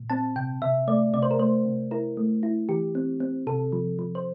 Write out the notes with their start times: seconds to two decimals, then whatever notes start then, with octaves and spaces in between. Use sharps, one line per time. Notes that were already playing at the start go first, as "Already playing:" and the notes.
Already playing: A#2
0.10 C4 A5
0.36 C3 G5
0.62 C3 E5
0.88 A3 D5
1.14 C3 D5
1.23 C5
1.31 A#4
1.39 A3 C5
1.65 C3
1.91 E4 A#4
2.17 A3
2.43 E4
2.69 E3 G4
2.95 C4
3.20 C4
3.47 C3 A4
3.73 F3
3.99 F3
4.15 C5